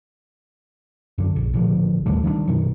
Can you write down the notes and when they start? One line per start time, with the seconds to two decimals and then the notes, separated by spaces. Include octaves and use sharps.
1.18 F#2 D3
1.36 A#1
1.54 A1 A#2 D3 F3
2.06 D#2 D#3 G3 A3
2.24 D#3 G3 A3 D4
2.48 F#2 B2 D#3